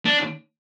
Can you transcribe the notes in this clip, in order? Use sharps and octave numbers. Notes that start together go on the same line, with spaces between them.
D4